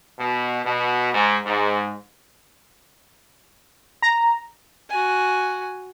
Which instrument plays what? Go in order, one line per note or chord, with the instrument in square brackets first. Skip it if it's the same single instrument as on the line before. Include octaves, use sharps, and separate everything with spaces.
[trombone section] B2
B2
G#2
G#2
[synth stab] A#5
[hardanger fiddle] F#4 G#5